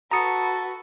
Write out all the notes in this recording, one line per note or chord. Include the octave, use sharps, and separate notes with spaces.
F#4 A4 B4 A#5 B5 D#6 C#7